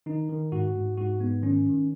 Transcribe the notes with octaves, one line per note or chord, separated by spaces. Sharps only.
D#3 D#4
D#3
G#2 F#4
G#2
G#2 F#4
G#2 B3
D#3 C#4
D#3